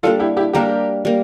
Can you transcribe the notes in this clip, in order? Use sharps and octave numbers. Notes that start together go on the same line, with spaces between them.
G3 A#3 D4 F4 A4
E4 G4
E4 G4
G3 A#3 D4 G4 A#4
G3 A#3